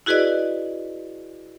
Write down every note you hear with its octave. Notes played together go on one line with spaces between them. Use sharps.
E4 F#4 G#4 B4 D5 D#5